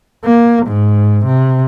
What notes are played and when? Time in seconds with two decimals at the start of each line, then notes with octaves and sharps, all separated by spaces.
0.24 A#3
0.67 G#2
1.26 C3